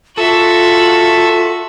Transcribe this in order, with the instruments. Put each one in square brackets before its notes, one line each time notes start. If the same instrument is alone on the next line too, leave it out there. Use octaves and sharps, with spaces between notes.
[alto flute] F4 [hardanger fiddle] F#4 E5 [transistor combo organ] A4